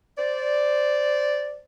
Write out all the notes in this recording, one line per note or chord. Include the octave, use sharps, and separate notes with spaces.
C5 D5